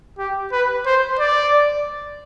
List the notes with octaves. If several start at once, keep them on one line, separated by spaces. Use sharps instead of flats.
G4
B4
C5
D5